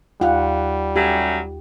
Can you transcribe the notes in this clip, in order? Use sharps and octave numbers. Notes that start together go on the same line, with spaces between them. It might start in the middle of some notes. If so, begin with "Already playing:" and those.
D#2 G3 F4 F5 F#5
F#3 A3 C#4 G4